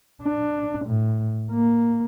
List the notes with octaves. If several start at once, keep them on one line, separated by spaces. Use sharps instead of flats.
D4
A2
A#3